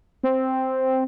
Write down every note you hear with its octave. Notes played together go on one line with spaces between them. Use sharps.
C4